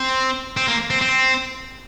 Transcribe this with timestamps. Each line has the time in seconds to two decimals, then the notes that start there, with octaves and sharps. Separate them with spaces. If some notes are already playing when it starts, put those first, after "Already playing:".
Already playing: C4
0.57 C4
0.68 A#3
0.90 C4
1.01 C4